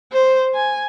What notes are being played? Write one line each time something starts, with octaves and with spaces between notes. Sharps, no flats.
C5
G#5